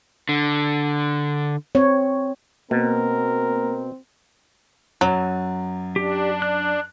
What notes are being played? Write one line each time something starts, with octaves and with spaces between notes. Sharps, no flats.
D3
C4 C#5
B2 A#3 C4 A#4
F#2 F#3
D4 G4
F#6